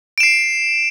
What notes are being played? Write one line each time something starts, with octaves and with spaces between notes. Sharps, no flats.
C7 D7 E7